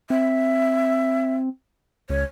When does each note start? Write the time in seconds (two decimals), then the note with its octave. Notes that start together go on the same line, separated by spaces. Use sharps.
0.10 C4 E5
2.10 C#2 C#5